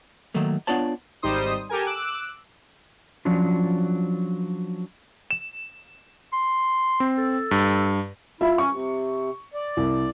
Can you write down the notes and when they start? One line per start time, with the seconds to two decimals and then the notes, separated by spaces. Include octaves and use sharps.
0.34 D#3 F#3 A3 A#3
0.67 B3 D4 F4 C#5 D5 A5
1.22 G#1 G3 D#4 C5 D#6
1.69 G4 A4 A#4 G#5
1.86 D6 E6 F#6 D7
3.25 F3 F#3 C#4 D4 F4
5.31 E7
6.33 C6
7.00 C4
7.18 A4
7.51 G2
8.41 E4 F4 E5
8.58 C#4 C#6
8.70 C3
9.54 D5
9.77 C2